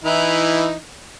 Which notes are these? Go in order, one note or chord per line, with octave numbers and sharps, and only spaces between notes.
E3 D#4 E4